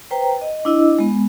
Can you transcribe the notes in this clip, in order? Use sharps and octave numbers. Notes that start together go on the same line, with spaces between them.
B4 C5 G5 A#5
D#5
D4 E4 D#5 E6
G#3 B3